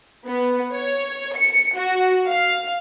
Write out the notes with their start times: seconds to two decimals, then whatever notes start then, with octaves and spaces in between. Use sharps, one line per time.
0.27 B3
0.72 C#5
1.37 C#7
1.75 F#4
2.28 F5